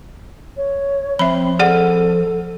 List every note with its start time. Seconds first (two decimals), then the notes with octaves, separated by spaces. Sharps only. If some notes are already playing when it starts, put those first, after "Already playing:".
0.57 C#5
1.19 F3 C4 E5 B5
1.59 G#4 A4 D5 F#5